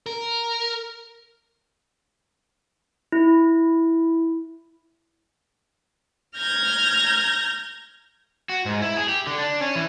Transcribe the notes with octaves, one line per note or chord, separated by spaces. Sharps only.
A#4
E4
A#5 F6 G6 G#6 A#6
F#4
G#2
E4
G#4
G4
D3
D4
C#4
E3